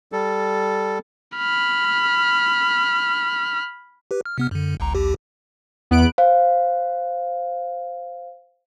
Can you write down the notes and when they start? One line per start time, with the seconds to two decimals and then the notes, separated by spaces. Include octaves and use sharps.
0.12 G3 A4
1.37 B5 F6
4.11 G4 B4
4.26 F6
4.38 C3 B3 F6
4.51 F#2 D3
4.80 G1 C#2 A#5
4.95 A#1 D#2 G4
5.91 E2 B3 F#6 D7
6.18 C5 F5